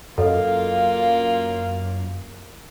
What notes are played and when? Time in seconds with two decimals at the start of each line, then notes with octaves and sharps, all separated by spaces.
0.18 F#2 A#3 F4 A4 D#5 F5